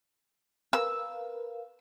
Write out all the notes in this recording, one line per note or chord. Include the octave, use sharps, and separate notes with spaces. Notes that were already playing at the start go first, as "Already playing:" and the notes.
A#4 B4 F5 E6